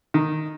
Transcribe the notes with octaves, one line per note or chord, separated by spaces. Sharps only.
D#3